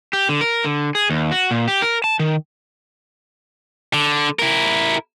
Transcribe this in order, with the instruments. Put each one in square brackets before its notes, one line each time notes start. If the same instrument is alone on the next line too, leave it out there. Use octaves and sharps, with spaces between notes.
[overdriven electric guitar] G4
D3
A#4
D3
G#4
D#2
F#4
A#2
G4
A#4
A5
D#3
[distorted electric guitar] D3
E4 A#4